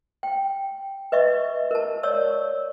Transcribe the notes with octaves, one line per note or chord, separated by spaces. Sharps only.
G5
B4 D#5 E5 C#6
A#4 A5
C#5 D5 C#6 E6